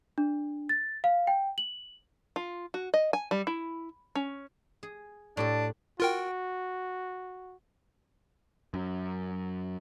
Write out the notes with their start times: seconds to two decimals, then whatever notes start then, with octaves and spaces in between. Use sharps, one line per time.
0.18 D4
0.69 A6
1.04 F5
1.27 G5
1.58 F#7
2.36 F4
2.74 F#4
2.94 D#5
3.13 G#5
3.31 G3
3.47 E4
4.15 C#4
4.83 G#4
5.37 A2 D4 G4 A4
6.00 F4 F#4 A#4 G5
8.74 F#2